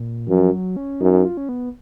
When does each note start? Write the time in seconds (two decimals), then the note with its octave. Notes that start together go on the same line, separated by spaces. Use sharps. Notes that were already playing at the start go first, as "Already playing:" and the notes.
Already playing: A#2
0.28 F#2 F3
0.52 F#3
0.76 C#4
1.01 F#2 D#4
1.25 F4
1.37 C#4
1.49 B3